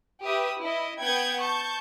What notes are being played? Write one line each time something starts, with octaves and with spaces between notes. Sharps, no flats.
G4 B4 E5 D#6
E4 D#5
B3 F#5 G5 G6 G#6
A5 C#6 G6